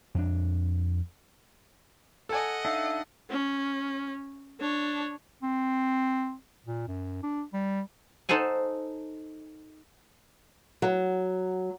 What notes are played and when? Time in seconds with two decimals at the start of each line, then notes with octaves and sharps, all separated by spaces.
0.15 F2 D4
2.29 A4 D#5 F#5 G#5
2.65 D4 D#4 E5 F5
3.30 C#4
4.60 D4 C#5
5.43 C4
6.66 A#2
6.88 F#2
7.23 D4
7.53 G3
8.29 D#4 A4 C5 F#5 G#5
10.82 F#3